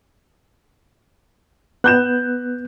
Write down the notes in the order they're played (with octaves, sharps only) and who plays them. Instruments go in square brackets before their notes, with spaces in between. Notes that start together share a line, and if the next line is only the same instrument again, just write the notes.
[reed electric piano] B3 [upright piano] F#6 G6 E7